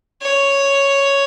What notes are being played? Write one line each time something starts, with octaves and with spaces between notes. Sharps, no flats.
C#5